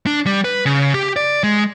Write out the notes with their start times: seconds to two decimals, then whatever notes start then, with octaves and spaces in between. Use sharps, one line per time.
0.06 D4
0.26 G3
0.44 B4
0.66 C#3
0.94 G4
1.16 D5
1.43 G#3